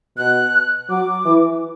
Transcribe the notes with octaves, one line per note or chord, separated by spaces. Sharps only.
B2 F#6
F#3 D6
E3